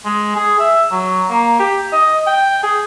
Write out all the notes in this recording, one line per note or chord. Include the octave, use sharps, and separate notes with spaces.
G#3
G#4
E5
F#3
A#3
G4
D#5
G5
G#4